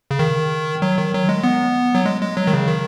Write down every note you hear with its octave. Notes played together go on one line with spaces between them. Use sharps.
C#3
D#3
F#3
D#3
F#3
G#3
B3
F#3
G#3
G#3
F#3
D#3
C#3
D#3